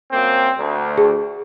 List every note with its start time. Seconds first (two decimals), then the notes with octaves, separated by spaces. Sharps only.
0.12 F#2 A#3 C4
0.57 D2
0.98 G#4